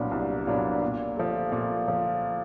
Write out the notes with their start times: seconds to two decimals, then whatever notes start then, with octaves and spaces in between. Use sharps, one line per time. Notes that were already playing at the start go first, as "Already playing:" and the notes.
Already playing: C2 A#2 F#3 B3 D4
0.11 C2
0.47 A#2 F#3 B3 D4
0.82 A#2
1.17 F3 A3
1.52 A#2
1.88 F3